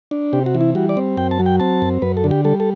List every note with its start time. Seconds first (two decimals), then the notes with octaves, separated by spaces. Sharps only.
0.11 D4
0.33 C3 G4
0.46 F#4
0.55 E3
0.61 E4
0.75 G3 F#4
0.89 D5
0.97 C4
1.17 F#2 G5
1.31 A5
1.40 F#3
1.46 G5
1.60 C4 A5
1.82 F#2
2.02 F#2 B4
2.17 A4
2.24 D3
2.31 G4
2.45 G3 A4
2.60 A4